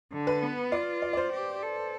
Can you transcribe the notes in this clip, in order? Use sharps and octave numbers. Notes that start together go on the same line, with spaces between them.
D3
B4
B3
F4 D5
D5
D5
C5
G4
A4